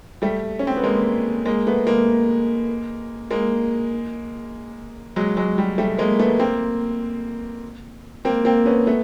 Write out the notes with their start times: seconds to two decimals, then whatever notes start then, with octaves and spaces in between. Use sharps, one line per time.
0.22 G3 A3
0.59 C#4
0.67 C4
0.76 B3
0.84 G#3 A#3
1.46 G#3 A#3
1.67 A3 B3
1.87 G#3 A#3
3.31 G#3 A#3
5.16 F#3 G#3
5.37 F#3 G#3
5.58 G3
5.78 G3 A3
5.98 G#3 A#3
6.19 A3 B3
6.39 A#3 C4
8.25 A#3 C4
8.45 A#3 C4
8.66 B3 C#4
8.86 A3 B3